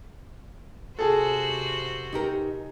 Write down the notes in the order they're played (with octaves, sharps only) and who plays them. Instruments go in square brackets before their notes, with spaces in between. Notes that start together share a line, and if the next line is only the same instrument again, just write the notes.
[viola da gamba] C3 F#4 C5 [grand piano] G#4 A4
[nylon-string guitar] D#4 G4 A#4